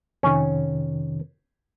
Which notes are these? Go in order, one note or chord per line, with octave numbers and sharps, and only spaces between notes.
F2 C3 D#3 C#4